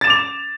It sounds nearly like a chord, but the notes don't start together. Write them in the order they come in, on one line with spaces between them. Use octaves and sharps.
A6 E7 D6 F7